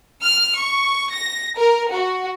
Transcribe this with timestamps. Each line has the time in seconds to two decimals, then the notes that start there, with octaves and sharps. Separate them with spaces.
0.22 F6
0.58 C#6
1.12 A#6
1.58 A#4
1.92 F#4